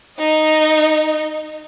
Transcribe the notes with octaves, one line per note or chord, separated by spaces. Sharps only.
D#4 D#5